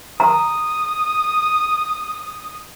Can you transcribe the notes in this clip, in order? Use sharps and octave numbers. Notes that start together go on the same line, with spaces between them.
A#5 D#6